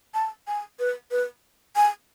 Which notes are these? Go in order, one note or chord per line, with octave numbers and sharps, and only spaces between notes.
A5
G#5
B4
B4
G#5